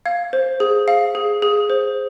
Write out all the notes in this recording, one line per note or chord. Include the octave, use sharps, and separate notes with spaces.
F5 G#6
C5
G#4
F5
G#4
G#4
C5